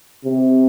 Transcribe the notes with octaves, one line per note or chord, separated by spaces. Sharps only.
C3